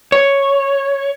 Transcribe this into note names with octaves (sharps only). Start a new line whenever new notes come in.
C#5